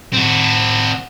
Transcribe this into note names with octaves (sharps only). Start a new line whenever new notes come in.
C4 F#4